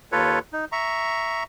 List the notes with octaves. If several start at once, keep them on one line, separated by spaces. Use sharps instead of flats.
D#2 F4 A4 B4 C#5
D#4
E5 A#5 C#6